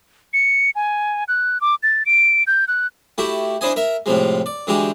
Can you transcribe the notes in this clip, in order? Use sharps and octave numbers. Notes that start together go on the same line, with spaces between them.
C#7
G#5
F#6
D6
A6
D7
G6
F#6
A3 E4 F#4 G4
D4 E4 C5 D#5 G#5
A#4 E5
A2 C3 F3 G#3
D5
D3 E3 G#3 F#4 G4